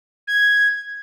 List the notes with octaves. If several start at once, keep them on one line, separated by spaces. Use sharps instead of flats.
G#6